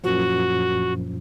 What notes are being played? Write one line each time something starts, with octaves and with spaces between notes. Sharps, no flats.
F#2 A#2 F3 F#4